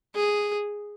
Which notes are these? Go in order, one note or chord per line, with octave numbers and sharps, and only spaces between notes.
G#4